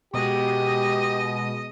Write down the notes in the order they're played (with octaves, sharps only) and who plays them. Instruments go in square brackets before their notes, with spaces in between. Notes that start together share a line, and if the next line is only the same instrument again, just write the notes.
[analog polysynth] B2 G#3 [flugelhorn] G4 [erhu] D#5